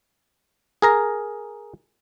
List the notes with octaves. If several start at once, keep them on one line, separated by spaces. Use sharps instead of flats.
G#4 A#4 A#5